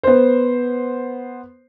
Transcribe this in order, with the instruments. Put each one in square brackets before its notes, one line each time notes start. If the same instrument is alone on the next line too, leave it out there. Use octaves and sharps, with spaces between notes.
[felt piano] B3 C5